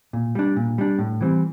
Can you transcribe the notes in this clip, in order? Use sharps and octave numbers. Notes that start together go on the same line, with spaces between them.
A#2
G3 D4
A#2
G3 D4
A2
E3 G3 C4